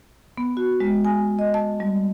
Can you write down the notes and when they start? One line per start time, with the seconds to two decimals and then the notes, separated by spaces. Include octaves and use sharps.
0.38 B3
0.57 F#4
0.80 G#3
1.05 G#5
1.39 D#5
1.54 A5
1.80 G3